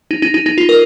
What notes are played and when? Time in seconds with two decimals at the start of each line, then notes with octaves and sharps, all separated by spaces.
0.11 D#4
0.22 D#4
0.34 D#4
0.46 D#4
0.58 F4
0.69 A#4